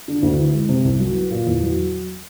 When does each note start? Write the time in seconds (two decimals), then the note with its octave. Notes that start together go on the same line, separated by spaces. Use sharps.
0.08 D3
0.23 D2
0.38 E3
0.54 G#3
0.69 C3
0.84 C2
1.00 F#3
1.15 B3
1.31 A#2
1.47 E2
1.62 F#3